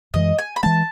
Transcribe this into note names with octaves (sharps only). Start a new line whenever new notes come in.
F#2 E3 G#3 D#5
G#5
B5
E3 G#3 A5